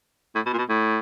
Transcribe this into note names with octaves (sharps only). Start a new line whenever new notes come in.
A2
B2
A#2
B2
A2